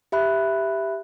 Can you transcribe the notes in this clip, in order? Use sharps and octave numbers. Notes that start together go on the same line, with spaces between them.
G4 E5 B5 F#6